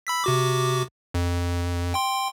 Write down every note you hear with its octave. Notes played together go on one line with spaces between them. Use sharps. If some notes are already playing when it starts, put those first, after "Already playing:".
B5 E6 B6
C3 F#4 D6
F2
G5 C6